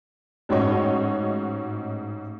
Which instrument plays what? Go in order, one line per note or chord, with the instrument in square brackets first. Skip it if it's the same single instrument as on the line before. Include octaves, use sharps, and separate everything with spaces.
[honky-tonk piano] A1 G#2 F#4 C#5 D#5